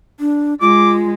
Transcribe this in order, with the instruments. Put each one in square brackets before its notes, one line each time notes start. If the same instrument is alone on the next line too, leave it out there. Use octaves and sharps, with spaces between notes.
[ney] D4
[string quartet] G#3 [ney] F4 [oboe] D6